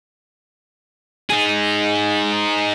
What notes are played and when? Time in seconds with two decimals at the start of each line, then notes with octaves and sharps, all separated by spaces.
1.30 D#4 G#4